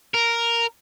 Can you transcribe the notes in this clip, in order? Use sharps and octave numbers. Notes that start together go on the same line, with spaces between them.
A#4